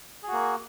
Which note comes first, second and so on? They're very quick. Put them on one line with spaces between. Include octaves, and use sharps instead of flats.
G#4 F#4 A#3